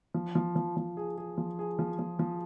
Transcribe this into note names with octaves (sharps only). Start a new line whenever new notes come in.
F3
F3
F3
F3
G#4
G#4
F3
G#4
F3
F3
F3